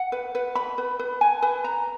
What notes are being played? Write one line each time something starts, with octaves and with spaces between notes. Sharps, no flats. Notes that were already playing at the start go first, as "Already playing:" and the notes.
Already playing: F#5
B4
B4
B5
B4
B4
G#5
B4
A#5